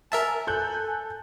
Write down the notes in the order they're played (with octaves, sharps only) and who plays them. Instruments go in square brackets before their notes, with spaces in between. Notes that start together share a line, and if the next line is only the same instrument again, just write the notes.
[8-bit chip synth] A#4 E5 A5 [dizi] G#5
[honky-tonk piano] A4 F#6 G6